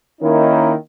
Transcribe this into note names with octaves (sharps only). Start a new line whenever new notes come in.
D#3 A#3 C#4 D#4 E4